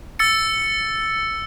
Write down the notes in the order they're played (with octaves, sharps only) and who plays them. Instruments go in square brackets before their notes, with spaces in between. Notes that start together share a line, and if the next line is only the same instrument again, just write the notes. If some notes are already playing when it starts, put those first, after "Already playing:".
[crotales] E6 A6 C#7